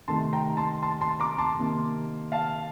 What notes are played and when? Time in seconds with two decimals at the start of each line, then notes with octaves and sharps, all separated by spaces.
0.08 C3 D#3 A3 A5 C6
0.33 G5 A#5
0.57 A5 C6
0.83 A5 C6
1.01 A5 C6
1.20 A#5 D6
1.38 A5 C6
1.58 C3 D#3 A#3
2.32 F5 A5